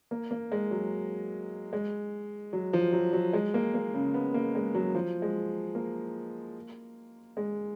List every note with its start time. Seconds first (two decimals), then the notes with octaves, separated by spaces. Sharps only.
0.11 A#3
0.31 A#3
0.52 G#3
0.71 F#3
1.73 G#3
2.53 F#3
2.73 F3
2.93 F#3
3.13 F#3
3.33 G#3
3.54 A#3
3.74 A#3
3.94 C#3
4.14 B3
4.34 A#3
4.55 G#3
4.74 F#3
4.95 F3
5.22 G#3
5.75 A#3
7.37 G#3